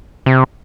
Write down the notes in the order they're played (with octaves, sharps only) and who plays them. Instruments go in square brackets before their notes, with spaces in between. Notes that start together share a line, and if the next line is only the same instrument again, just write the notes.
[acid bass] C3